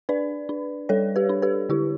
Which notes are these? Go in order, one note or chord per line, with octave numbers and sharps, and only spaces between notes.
D4 B4 D5
D4
G3 A4 C#5
G4 B4
D4
G4 B4
D3 E4 G4